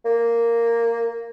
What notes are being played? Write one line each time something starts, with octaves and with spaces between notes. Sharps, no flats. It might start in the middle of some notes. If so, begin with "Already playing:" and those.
A#3